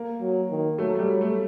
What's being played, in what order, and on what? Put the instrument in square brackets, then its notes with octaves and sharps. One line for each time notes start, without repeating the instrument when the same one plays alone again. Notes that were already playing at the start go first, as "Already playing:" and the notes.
Already playing: [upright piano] A#3
[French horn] F#3
D#3
[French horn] F#3 [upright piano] A3
[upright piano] A3
G3
[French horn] F#3
[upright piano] A3